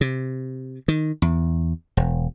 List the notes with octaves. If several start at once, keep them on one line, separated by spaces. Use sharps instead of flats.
C3
D#3
E2
E1